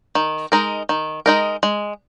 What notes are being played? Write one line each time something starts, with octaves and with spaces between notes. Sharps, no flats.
D#3
G#3 D#4 A#4
D#3
G#3 D#4 A#4
G#3